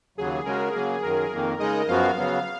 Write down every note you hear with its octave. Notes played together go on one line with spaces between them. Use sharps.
D#2 C#3 F#3 G#4
C#3 G#3 C#4 F#4 A#4
C#3 F#3 A#3 G#4
F#2 D#3 F#3 A#4
F2 D#3 A#3
C#3 G#3 D#4 G#4 D#5
F#2 F3 B3 F#4 F5
C#3 F#3 B3